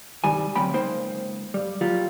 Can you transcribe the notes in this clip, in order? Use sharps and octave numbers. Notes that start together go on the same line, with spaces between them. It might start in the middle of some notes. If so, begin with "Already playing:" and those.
C2 G2 D#3 G3 G#5
D2 C3 F#3 A#3 G5 B5
C#2 A#3 D#4 C5 G5
G2 G3
F#3 G3 A#3 F4